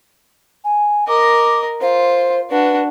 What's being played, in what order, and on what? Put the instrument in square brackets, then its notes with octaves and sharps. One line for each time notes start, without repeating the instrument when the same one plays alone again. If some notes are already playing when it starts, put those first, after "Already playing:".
[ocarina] G#5
[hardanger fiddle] A#4 D#5 [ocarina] D6
[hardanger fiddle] F4 [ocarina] C5
[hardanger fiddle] D4 F#4 [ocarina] B4